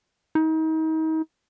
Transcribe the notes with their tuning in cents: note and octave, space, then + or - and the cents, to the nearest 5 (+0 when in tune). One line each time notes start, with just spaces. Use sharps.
D#4 +35